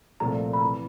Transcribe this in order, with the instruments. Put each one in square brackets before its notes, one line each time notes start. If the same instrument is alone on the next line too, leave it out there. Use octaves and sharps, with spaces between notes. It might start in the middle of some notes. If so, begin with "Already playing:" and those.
[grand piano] C2 A#2 F3 A3 C4 [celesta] A#5
[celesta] B5
[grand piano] C3 E3 [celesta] A#5